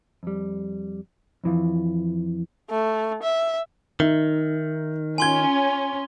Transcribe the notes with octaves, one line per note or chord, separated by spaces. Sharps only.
F2 G3
F2 E3 F3
A3
E5
D#3 D#4 E5
C#4 F4 G#5 C6 G#6 G7